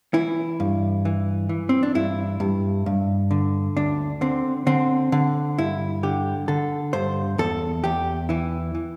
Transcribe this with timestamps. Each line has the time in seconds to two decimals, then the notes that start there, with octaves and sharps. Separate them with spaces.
0.14 E3 E4
0.60 G2
1.05 E3
1.49 E3
1.69 C4
1.83 D4
1.95 G2 E4
2.40 G2
2.86 G2
3.31 D3
3.77 D2 D4
4.21 D3 C4
4.67 D3 C4
5.12 D3
5.58 G2 E4
6.03 D3 G4
6.48 D3 A4
6.93 G2 C5
7.38 E2 A4
7.84 E2 G4
8.29 E3 E4
8.75 E3